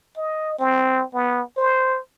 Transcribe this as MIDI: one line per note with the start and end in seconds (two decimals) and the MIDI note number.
0.17 0.59 75
0.59 1.04 60
1.14 1.42 59
1.57 1.99 72